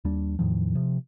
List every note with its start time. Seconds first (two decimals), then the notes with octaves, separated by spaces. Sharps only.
0.05 D#2 G3 D4
0.39 E2 A2 D#3 F3
0.75 C3 F3